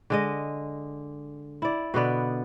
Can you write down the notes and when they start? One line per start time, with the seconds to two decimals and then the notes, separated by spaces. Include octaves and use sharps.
0.10 D3 G#3 D#5
1.62 E4 D5
1.94 B2 D3 B3 D5